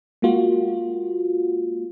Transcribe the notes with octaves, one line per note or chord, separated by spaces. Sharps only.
G#3 A#3 F4 F#4